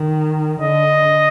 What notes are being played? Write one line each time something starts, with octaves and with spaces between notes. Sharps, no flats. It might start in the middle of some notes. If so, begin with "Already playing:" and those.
Already playing: D#3
D3 D#5